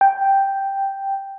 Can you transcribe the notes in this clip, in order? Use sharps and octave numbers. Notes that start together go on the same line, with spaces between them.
G5